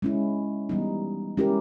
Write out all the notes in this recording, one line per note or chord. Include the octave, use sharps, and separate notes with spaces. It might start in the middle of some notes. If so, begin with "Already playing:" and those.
G#3 C#4 E4
E3 G3 B3 D#4
G#3 C#4 E4 G4 A#4